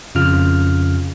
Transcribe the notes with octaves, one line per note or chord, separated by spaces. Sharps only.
F2 C#3 F4 F6